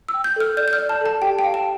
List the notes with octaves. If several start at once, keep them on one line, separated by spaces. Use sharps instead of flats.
E6
G5
G6
A4 F6
D5 G6
G6
F6
D5
A5
A4 A5
G4 G5
G5
F5
A5